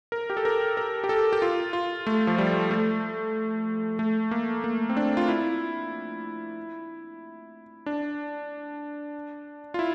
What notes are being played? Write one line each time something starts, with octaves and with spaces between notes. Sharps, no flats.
A#4
G4
A4
A#4
A#4
G4
A4
G4
F4
F4
A3
F3
G3
A3
A3
A#3
A#3
C4
D4
F4
E4
D4
F4
E4